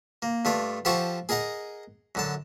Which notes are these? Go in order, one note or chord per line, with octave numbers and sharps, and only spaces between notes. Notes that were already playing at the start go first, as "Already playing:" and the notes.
A#3
G2 A3 F4 D5
F3 G4 A4 C5 F#5 C#6
G#4 A#4 D#5 F#5 A#5
F#2 D3 A5